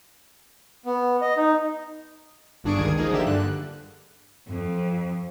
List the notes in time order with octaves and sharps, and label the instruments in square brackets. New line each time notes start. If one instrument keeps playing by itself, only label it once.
[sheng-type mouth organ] B3
D#5
D#4
[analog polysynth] G1 G2 D4 G#4 C#6 D7
G#1 C#2 D#3 G#4 G#6
F3 A#3 D#4 G#4
D3 A#3 G4 E5 E7
G2 D3 F#6
[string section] F2